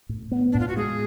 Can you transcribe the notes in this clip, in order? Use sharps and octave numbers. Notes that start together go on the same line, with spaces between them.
A2
B3
A2 D4
F4
F#4
G#3 G#4